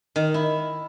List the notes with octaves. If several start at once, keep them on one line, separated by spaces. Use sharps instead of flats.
D#3
E4